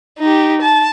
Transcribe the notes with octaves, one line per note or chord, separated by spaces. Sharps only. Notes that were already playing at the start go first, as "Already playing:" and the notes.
D#4 G4
A5